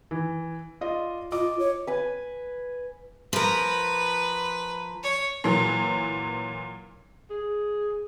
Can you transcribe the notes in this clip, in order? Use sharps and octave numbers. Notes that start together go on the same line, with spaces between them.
E3
F4 D5 D#5
F4 D#5 D6
C#5
B4 G#5
F3 A#4 B4
C#5
A#2 E3 F#3
G#4